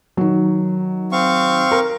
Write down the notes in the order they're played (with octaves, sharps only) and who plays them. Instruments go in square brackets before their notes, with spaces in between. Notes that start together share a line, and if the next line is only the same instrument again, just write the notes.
[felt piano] D#3 F#3
[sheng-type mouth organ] C4 F5 C#6
[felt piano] A#4